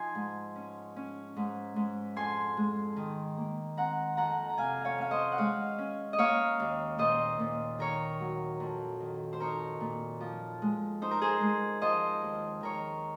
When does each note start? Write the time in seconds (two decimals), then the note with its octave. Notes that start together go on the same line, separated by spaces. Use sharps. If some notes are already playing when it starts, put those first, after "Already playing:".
Already playing: F3 D#4 G#5 C6
0.15 G#2
0.56 C#4
0.96 C#4
1.36 G#2
1.76 G#2
2.16 F2 G#5 C6
2.57 G#3
2.96 D#3
3.37 A#3
3.77 C4 F#5 A#5
4.17 F2 F#5 A#5
4.49 A#5
4.58 C3 F5 G#5
4.85 C#5 F5
4.98 C#4 F5
5.11 C5 D#5
5.32 F#5
5.38 G#3 C#5 F5
5.78 C#4
6.13 D#5
6.18 A#3 C#5 F5
6.60 D#2
6.98 A#2 C5 D#5
7.39 A#2
7.78 D#3 A#4 C#5
8.20 F#3
8.60 F2
9.00 D#3
9.33 C5
9.40 D#4 A#4 C#5
9.80 A#2
10.20 F3
10.62 G#3
11.02 D#4 C5
11.11 A#4
11.21 G#4 C5
11.41 G#3
11.82 F3 C5 D#5
12.22 D#2
12.61 D#3 A#4 C#5